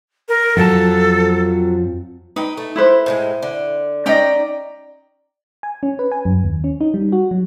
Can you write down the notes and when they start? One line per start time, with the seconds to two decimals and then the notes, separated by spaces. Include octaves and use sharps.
0.29 A#4
0.57 F2 F3 F#3 A4 A5
2.36 D#4 B4 G5
2.57 A3
2.76 E4 B4 C5
3.06 A2 E3 G#3
3.42 D3
4.06 C#4 D#4 D5 D#5 G5 A#5
5.63 G#5
5.83 C#4
5.99 B4
6.12 G#5
6.25 F#2
6.44 D#2
6.64 C#4
6.81 D#4
6.94 G3
7.12 F#4
7.31 F#3